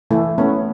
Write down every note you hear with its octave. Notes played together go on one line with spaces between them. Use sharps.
E3 A3
A3 B3 C#4